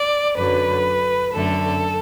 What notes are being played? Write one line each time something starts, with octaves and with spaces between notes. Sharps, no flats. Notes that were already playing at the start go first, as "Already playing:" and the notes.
Already playing: D5
F#2 D3 F#3 B4
F#2 D3 A3 A4